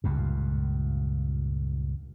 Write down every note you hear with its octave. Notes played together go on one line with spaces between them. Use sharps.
C#2 G2 A#2